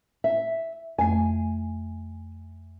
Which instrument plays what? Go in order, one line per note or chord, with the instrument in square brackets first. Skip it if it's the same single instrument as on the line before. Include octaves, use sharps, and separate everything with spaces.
[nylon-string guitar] E5
[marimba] F2 A3 [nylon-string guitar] G#5